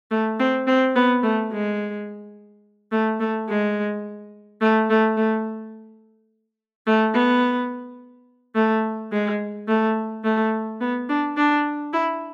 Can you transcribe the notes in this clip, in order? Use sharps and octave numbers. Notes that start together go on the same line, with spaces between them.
A3
C4
C4
B3
A3
G#3
A3
A3
G#3
A3
A3
A3
A3
B3
A3
G#3
A3
A3
B3
D4
D4
E4